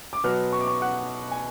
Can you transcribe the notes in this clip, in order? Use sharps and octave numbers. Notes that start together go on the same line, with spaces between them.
D6
B2 F#3 B3 F6
C#6
D6
C#6
F#5
G#5